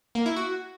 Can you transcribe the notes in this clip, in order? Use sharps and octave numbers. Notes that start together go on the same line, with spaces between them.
A#3
E4
F#4